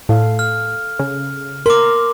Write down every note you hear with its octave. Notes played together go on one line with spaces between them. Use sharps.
A2 A4 F5
F6
C#3
A#4 C6 D6